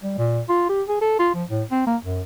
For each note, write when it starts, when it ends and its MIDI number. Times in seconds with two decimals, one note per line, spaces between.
0.03 0.15 55
0.18 0.41 46
0.49 0.66 65
0.69 0.83 67
0.88 0.99 68
1.01 1.17 69
1.19 1.31 65
1.34 1.44 53
1.49 1.63 45
1.71 1.82 60
1.87 1.97 58
2.04 2.22 42